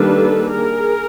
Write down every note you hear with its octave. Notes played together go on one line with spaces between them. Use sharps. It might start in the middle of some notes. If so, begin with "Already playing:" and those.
Already playing: D#3 G3 A#3 D4 A4 B4
G#4 A#4